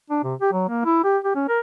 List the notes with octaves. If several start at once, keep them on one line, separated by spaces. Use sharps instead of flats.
D4
C3
G4
F#3
A#3
E4
G4
G4
C#4
A#4